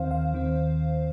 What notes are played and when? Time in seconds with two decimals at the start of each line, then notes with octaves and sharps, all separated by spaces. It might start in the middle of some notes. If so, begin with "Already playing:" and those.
Already playing: D#2 D#3 C4 C5 F5
0.11 F5
0.33 D#2 D#3 C4